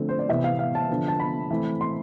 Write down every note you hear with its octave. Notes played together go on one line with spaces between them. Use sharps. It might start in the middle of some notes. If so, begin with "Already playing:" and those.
Already playing: D3 F3 A3 C4
C5
D5
C3 E3 B3 E5
F5
F5
A5
D3 F3 B3
A5
B5
E3 A3 C4
C6